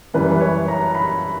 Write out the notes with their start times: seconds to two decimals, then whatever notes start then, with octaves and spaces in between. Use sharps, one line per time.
0.14 F#2 E3 G3 B4
0.31 B4
0.40 C#5
0.68 A#5
0.95 B5